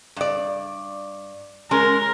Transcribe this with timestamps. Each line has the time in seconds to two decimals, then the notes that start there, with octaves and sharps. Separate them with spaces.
0.16 G2 D5
1.71 G#3 C#4 A#4